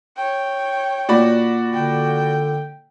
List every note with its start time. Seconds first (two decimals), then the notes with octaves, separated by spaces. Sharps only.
0.17 C#5 G5
1.09 A#2 F#4 D5 B5
1.73 D3 G5